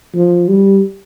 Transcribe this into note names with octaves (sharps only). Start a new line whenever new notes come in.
F3
G3